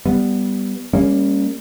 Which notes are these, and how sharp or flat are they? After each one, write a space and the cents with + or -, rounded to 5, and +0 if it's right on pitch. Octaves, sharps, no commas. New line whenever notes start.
G3 +0 B3 -5
G3 +40 A#3 +0 C#4 +0